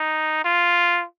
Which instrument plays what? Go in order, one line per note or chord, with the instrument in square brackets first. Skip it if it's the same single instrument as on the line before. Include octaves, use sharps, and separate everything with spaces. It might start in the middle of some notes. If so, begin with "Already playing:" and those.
Already playing: [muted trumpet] D#4
F4